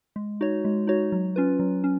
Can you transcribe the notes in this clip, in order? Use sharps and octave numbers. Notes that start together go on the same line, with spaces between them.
G#3
D#4 F#4 C#5
G#3
D#4 F#4 C#5
F#3
C#4 F4 B4
F#3
C#4